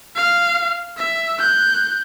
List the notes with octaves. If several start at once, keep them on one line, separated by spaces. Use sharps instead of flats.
F5
E5
F#6 G6